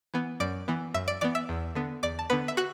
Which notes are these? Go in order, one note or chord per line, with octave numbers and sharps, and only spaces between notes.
E3 B3
F#2 D5 D6
E3 B3
F#2 E5 E6
D5 D6
E3 B3 D5 D6
E5 E6
E2
D3 B3
E2 D5 D6
A5
D3 B3 B4 B5
E5
F#4 F#5